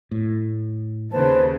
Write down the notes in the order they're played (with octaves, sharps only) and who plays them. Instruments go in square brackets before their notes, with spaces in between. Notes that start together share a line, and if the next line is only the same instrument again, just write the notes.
[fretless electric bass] A2
[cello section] D#2 C#3 [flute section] B4 C5 A5